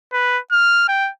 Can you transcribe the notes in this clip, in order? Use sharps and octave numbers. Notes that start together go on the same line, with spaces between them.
B4
F6
G5